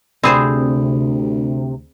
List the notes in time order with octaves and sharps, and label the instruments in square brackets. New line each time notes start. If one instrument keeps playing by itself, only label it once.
[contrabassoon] D2 [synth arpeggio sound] C3 [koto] C4 G#4 C5 [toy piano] D5 B5 D#6